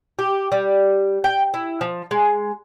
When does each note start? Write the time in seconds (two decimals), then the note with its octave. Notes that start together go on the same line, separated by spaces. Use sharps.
0.19 G4
0.52 G3
1.24 G5
1.54 E4
1.81 F3
2.11 G#3